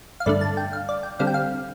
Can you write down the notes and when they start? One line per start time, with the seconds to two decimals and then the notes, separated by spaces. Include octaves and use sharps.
0.20 F5
0.26 G2 D3 A3 D4 D5
0.41 A5
0.57 G5
0.73 F5
0.89 D5
1.03 G5
1.19 D3 G3 C4 F5
1.27 G5
1.34 F5